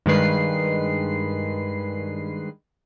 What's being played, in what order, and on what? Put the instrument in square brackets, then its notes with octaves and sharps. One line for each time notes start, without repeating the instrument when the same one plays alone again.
[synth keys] G2 D#3 G#3 B4 C7